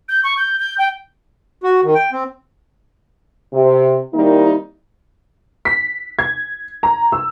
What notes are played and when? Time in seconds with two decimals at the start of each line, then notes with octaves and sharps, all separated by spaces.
0.09 G6
0.24 C#6
0.37 G6
0.59 G6
0.78 G5
1.64 F#4
1.83 D#3
1.95 G5
2.12 C4
3.53 C3
4.13 D#3 G3 A#3 C4 D#4 E4
5.65 B6
6.19 G#6
6.83 A#5
7.12 E6